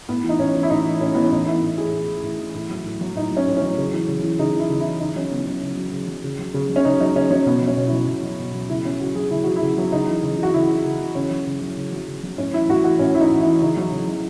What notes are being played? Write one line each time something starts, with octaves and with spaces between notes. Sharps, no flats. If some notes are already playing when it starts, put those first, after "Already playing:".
A2 B3
E3
D#4
A2 C#4
E3
E4
A2 D#4
E3
A2 C#4
E3 B3
C#4
A2 D#4
E3 E4
A2
E3 G#4
A2
E3
A2
E3
A2 E4
F#3
A2
F#3
A2 D#4
F#3
C#4
A2
C#4
F#3
C#3
E3
C#3
E3
C#3 D#4
E3 E4
C#3
E4
E3
C#3 D#4
F#3 C#4
C#3 B3
F#3 C#4
C#3
F#3
C#3
F#3
C#3
F#3
C#3
F#3
C#4
C#3 D#4
F#3 D#4
C#3 C#4
F#3 C#4
B2 B3
F#3
C#4
B2
E4
F#3
B2
F#3
B2
F#3
C#3 E4
F#3 C#4
C#3 F#4
F#3 G#4
C#3 E4
F#3 F#4
E4
C#3
F#3
C#3 D#4
E3
C#3
E3 F#4
C#3 E4
E3
C#3
E3
C#3 C#4
F#3
C#3
F#3
C#3
F#3
C#3
F#3
A2 C#4
E3 E4
A2 F#4
E3 F#4
A2 C#4
E3 E4
D#4
A2
E4
E3
C#3 D#4
F#3
C#3
F#3